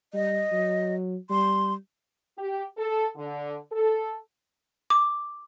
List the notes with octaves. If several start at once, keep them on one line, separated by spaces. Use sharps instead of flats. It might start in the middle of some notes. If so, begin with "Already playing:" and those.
G3 D#5
F#3
G3 C6
G4
A4
D3
A4
D6